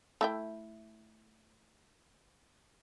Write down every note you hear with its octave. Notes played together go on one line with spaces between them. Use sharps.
A3 E4 G5